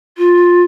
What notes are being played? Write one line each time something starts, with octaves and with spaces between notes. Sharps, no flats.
F4